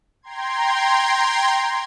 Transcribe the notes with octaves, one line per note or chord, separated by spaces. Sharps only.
G5 A#5 C6 G#6